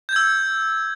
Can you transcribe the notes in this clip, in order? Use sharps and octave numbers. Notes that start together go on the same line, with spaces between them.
E6 G6 G#6